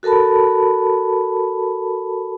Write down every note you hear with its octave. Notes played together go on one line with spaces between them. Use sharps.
F#4 A4 A#4 A5 B5